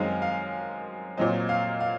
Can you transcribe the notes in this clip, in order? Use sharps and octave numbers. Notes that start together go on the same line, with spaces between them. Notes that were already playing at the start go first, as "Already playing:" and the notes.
Already playing: F#2 D#3 G#3 C4 F5
F5
A#2 F#3 C4 D#5
F5
F5